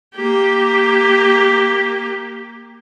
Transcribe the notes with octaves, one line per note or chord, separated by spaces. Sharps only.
A#3 G4